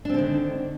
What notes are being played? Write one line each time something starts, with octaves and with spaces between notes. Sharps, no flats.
D3 D#3 C4 D4